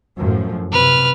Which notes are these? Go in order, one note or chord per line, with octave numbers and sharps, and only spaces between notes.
F#2 A2 F3
C3 B4 F6